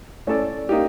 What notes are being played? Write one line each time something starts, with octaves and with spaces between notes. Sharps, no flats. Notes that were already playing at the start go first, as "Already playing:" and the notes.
A3 C#4 E4 A4 D5
A#3 D#4 G4